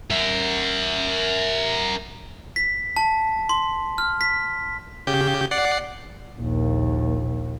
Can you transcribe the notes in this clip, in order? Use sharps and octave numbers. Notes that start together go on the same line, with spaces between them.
A#4 E5
B6
A5
C6
F6
B6
C#3 G4 G6
D5 F#5 C7
A#1 D#2